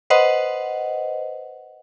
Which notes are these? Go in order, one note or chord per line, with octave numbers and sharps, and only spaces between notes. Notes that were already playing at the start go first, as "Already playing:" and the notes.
B4 C5 D#5 F#5